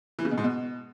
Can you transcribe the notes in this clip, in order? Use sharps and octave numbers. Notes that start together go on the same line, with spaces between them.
E3
C#3
B2
G#2
B2